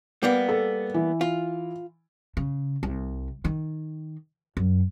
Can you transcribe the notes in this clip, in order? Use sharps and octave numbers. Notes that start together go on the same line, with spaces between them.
G3 A#3 B3
A4
E3
F4
C#3
C2
D#3
F#2